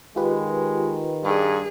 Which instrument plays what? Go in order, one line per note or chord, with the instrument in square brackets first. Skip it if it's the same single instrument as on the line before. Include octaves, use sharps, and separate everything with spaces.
[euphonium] D#3 [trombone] G#3 [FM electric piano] F4 G4 B4
[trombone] G2 [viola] G#4